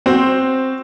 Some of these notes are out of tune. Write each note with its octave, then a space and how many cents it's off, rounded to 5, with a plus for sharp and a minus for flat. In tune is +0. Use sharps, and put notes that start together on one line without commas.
C4 +5 F#4 +0 C5 +0